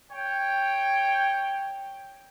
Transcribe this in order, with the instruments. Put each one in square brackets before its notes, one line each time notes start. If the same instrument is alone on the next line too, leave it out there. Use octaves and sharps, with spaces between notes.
[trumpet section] C#5 G5